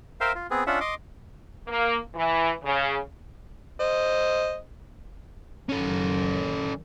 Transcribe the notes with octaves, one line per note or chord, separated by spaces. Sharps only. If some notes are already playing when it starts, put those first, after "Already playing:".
A#4 C5 E5 F5 G5
F4
B3 C4 G#4
C#4 D4 F4 E5 F#5
D#5 C6 D6
A#3
E3
C#3
C5 D#5
F#1 F#2 D#3 C#4 A4